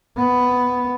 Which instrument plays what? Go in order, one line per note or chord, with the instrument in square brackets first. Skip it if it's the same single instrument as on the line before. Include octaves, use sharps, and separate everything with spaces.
[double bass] B3